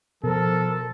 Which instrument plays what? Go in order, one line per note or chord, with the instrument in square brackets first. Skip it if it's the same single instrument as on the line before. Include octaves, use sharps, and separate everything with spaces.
[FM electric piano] B2 [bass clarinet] F3 [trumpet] A4 [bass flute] A#4